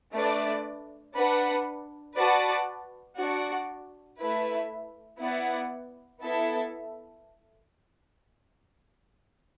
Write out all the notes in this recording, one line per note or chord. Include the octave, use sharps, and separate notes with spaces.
A3 D4 B4 D5
D4 B4 F#5
F#4 B4 D5 F#5 A5
D4 F#4 D5
A3 E4 B4 E5
B3 E4 D5 F#5
B3 E4 A4 E5 A5